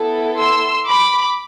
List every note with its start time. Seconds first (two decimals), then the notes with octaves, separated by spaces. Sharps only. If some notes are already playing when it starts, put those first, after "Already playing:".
Already playing: B3 E4 A4
0.38 C6 E6
0.88 B5 D6